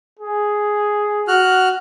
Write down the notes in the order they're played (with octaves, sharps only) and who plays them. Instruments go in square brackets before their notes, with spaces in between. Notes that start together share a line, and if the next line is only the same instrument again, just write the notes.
[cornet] G#4
[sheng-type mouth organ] F#4 F6 F#6